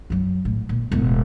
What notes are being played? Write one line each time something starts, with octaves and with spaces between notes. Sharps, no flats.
F#2 F#3
A2
A#2
E1 A2